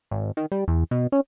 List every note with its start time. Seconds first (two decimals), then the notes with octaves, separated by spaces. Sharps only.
0.11 G#1
0.37 D#3
0.52 G3
0.68 E2
0.91 B2
1.12 C#4